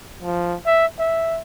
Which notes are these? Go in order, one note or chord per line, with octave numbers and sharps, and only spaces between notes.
F3
E5
E5